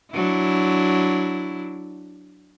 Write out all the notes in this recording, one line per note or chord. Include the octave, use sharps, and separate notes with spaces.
F#3 D4 E4